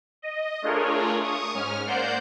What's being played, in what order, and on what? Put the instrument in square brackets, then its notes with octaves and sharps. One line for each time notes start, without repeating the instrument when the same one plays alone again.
[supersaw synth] D#5
A3 D4 F4 G#4 A#4 C#5
C#6 D#6
G#2 C#4 F6
A#3 C5 D5 F#5 G6